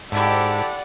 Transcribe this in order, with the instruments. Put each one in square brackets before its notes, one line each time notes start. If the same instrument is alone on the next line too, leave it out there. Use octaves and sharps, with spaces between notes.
[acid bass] G#2 [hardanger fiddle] E4 G4 [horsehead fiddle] A4 [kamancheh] D5 F#5